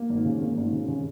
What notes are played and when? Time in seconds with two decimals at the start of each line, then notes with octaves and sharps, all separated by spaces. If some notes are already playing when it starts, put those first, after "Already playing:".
Already playing: A#3
0.09 G#1
0.25 C#3
0.42 A#3
0.57 G#1
0.72 C#3
0.88 C#3